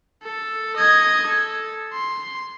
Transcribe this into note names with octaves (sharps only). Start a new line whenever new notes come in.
A4
D#5 G#6
A4
C6